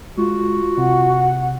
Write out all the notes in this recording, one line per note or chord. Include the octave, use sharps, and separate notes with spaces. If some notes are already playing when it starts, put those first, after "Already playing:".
G#3 F4 F#4
C3 F#5